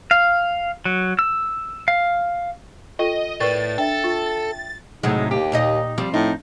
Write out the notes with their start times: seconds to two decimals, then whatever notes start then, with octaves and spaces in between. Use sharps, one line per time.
0.11 F5
0.85 F#3
1.19 E6
1.88 F5
2.99 F4 A4 D#5 G5 D#7
3.40 A2 A#4 B4 D5 G5 C#6 A6
3.78 D4 A4 E5 G5
4.04 F4
5.03 A2 C3 F#3 G#3 D#4
5.31 D#2 G4
5.52 A#2 D#4 D#5
5.98 F3 G3 C4
6.14 A2 D#4